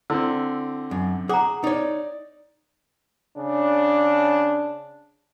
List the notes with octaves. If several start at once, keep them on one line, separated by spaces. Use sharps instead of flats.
D3 C4 E4 E6
F#2
G#4 F#5 A#5 D6
D#4 C#5 D5
C#3 D4